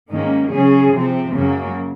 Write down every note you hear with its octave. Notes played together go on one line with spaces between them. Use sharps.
G#2 D#3 A#3 C#4
C#3 F#3 C#4 G#4
C3 F3 C4
F#2 C#3 F#3 A#3